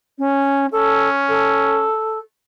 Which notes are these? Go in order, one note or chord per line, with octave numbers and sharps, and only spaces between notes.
C#4
C#4 A4
A4